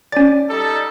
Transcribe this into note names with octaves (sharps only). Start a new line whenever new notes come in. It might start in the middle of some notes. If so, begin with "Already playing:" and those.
C#4 D5 A6
G3 D#4 A4